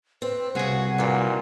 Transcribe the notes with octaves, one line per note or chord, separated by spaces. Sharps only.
C4 B4
C2 C#3 F#4 G#4 F#5
F#2 A#2 E3